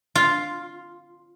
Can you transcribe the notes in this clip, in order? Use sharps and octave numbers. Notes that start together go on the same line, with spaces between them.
F4